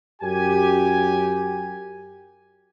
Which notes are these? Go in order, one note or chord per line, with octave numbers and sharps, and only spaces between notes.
F#2 G4 G#5